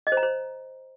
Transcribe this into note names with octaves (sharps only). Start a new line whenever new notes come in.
D#5
C5
A#5
C5